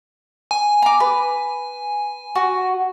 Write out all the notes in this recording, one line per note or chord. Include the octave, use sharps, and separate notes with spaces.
G#5
A#5 D6
B4
F#4